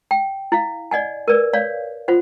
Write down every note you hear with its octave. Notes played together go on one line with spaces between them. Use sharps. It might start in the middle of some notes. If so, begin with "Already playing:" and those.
G5
E4 F5
D5 D#5 F#5 G#5
A#4 B4 D5
C#5 D5 F5
F4 C5 F#5